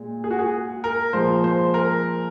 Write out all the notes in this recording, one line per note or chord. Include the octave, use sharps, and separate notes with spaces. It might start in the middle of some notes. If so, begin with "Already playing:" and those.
Already playing: A#2 G#3
G#4
F#4
G#4
A#4
A#2 F3 G#3 C5
C5
A#4